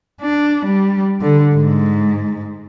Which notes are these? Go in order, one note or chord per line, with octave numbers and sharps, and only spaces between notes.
D4
G3
D3
G#2